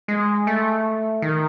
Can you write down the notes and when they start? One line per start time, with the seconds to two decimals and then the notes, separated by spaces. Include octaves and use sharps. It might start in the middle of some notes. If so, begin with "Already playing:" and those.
0.08 G#3
0.47 A3
1.22 D#3